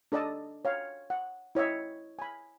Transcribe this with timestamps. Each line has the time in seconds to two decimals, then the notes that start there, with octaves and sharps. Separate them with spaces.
0.12 D4 A4 D5 D#5 A5
0.65 C#5 F5
1.10 F#5
1.55 E4 C#5 D#5 E5
2.19 G#5 B5